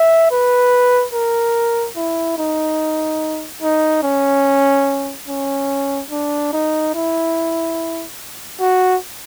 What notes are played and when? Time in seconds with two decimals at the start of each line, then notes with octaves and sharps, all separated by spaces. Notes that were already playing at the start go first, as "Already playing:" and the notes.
Already playing: E5
0.31 B4
1.13 A#4
1.96 E4
2.38 D#4
3.62 D#4
4.03 C#4
5.28 C#4
6.10 D4
6.53 D#4
6.94 E4
8.60 F#4